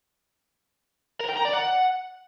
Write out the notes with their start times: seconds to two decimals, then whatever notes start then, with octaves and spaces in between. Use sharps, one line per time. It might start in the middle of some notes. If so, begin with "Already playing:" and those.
1.20 A#4
1.29 G5
1.37 A#5
1.45 D5
1.53 F#5